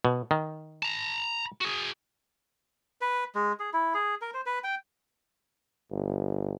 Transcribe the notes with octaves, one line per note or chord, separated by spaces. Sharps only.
B2
D#3
A5 A#5
F#4 G#4
B4
G#3
G#4
E4
G#4
A#4
C5
B4
G5
G1